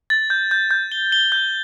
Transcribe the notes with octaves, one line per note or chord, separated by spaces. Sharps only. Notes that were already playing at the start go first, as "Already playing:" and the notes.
A6
G6
G6
G6
G7
G7
G6